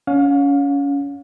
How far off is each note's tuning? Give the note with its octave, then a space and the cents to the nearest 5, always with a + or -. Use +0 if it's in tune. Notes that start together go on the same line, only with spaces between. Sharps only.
C#4 +25 F5 +40